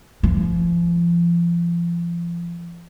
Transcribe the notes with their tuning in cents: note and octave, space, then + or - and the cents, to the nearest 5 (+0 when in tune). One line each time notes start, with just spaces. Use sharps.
F3 -35